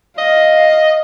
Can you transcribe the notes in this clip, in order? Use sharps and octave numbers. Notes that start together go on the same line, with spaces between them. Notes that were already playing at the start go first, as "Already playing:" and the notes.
D#5 F5